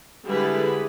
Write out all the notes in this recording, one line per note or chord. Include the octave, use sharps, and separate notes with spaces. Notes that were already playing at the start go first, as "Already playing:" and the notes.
D3 G3 G#3 E4 G#4 B4